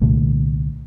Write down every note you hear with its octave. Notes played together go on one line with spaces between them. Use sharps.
C2 A#2 D3 A3